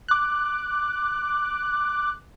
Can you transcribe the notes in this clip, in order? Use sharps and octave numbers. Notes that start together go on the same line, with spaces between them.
D6 F#6